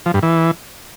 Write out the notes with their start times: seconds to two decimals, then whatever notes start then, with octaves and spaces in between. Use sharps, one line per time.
0.06 F3
0.14 G2
0.23 E3